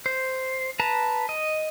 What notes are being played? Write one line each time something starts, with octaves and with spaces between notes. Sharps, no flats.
C5
B4 A5 A#5
D#5